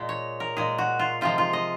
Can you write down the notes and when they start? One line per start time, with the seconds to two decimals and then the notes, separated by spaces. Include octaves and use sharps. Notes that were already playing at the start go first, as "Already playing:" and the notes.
Already playing: A#2 G#3
0.09 C#5
0.40 A#4
0.57 A#2 G#3 G#4
0.78 F#4
0.99 F4
1.21 C3 F3 G#3 F4
1.38 F4
1.53 D#5